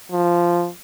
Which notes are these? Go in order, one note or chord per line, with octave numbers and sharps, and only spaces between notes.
F3